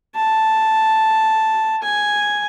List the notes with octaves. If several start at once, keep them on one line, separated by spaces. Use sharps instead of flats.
A5
G#5